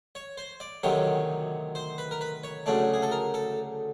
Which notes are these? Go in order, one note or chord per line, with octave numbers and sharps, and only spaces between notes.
C#5
C5
D5
D2 C3 D#3 F#3 C#5
C5
B4
A#4
B4
C#5
D2 C#3 F#3 A3 D4 D5
G#4
A4
A#4
A4